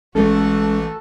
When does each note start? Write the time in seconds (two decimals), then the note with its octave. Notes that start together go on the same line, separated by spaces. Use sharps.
0.15 A1 E3 G#3 A3 C#4 F#4 A4 A5